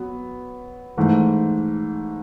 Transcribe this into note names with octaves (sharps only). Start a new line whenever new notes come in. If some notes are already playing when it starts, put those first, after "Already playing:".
Already playing: F#3 B3
G#2 E3 A3